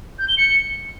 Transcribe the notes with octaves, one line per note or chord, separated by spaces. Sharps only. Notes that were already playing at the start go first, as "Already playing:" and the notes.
G6
G7
C#7